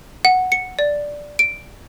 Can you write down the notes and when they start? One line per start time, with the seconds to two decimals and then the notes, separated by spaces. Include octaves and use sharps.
0.25 F#5
0.52 C#7
0.79 D5
1.39 D7